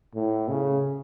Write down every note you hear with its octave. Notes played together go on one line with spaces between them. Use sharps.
A2
C#3